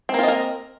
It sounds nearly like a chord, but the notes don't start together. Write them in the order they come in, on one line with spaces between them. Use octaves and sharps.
C4 A#3 F4 D#5 A#4